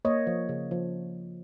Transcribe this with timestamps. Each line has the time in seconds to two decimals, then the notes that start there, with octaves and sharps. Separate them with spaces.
0.05 A#3 C#5 D#5
0.27 F3
0.49 C#3
0.71 F3